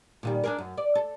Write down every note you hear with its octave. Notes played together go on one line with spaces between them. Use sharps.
A#2 D#3 G3
D4 G#4 A#4
F#2
D5
A4